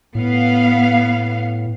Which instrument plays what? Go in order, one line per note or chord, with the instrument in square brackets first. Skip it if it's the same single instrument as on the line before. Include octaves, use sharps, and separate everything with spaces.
[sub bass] A2 [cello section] B3 F5